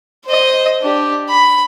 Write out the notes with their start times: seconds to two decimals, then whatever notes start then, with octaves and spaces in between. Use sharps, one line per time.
0.25 C5 D#5
0.81 D4 G4
1.29 B5